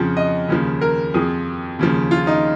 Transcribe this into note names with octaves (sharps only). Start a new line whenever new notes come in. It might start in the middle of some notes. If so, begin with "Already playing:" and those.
Already playing: F2 C#3 F3
D#5
D#2 C#3 F3
A#4
F2 F3 G#4
D#2 C#3 F3
F4
D#4